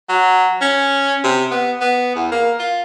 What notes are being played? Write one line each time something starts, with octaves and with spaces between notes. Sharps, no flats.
F#3
C#4
C3
B3
B3
E2
A#3
F4